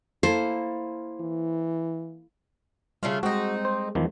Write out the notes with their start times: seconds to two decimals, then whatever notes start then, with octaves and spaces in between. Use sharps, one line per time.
0.23 A#3 E4 A4 C5
1.21 E3
3.03 C#3 G3 A3 F4
3.23 G#3 C4 D#4 F#4
3.65 C5
3.95 E2 D#3 F3